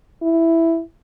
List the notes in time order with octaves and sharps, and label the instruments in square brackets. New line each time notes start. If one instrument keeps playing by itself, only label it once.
[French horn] E4